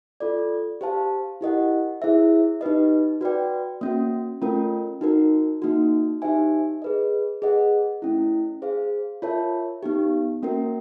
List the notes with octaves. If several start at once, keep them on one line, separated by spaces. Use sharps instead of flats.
F4 A4 D5
G4 C5 F5 A5
E4 G4 A#4 D#5 F#5
E4 G#4 C5 E5
D#4 G4 B4 D#5
F#4 B4 D5 G5
A#3 C#4 F#4
A3 C#4 F4 A#4
D#4 F#4 A#4
A#3 D#4 F#4
D#4 G4 C5 E5 G#5
G#4 B4 D#5
G#4 B4 D#5 F#5
A3 C#4 E4
G#4 C5 F5
F4 A#4 C#5 E5 A5
B3 D#4 G4
A#3 C#4 F#4 A#4